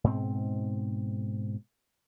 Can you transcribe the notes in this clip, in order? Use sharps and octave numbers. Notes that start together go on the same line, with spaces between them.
G#2 B2 C4